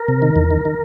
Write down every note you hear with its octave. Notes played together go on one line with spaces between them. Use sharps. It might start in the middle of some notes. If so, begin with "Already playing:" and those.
Already playing: A#4
C3
D#3
E2
D#3
D#3